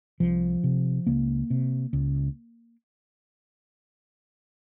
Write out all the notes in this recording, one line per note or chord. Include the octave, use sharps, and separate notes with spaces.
C2 F3
C3
C#2 A#3
C3
C#2